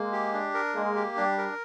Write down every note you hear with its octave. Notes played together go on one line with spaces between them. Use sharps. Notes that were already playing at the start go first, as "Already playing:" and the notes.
Already playing: G#3 A#3
G4
D4
A#4
G#3 A#3
G4
G3 D4
A#4